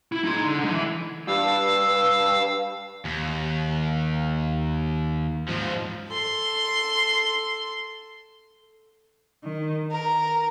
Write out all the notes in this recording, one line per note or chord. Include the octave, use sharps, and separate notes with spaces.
E4
D#4 C6
D3
D3 G#3
E3
G2 F5 E6
D#2
G#2 F3
A4 C6
D#3
A#4